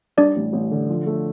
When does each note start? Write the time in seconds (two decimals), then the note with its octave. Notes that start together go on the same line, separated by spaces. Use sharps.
0.17 G3 D4 D5
0.36 A1
0.53 A1
0.71 D3
0.89 F3
1.06 A3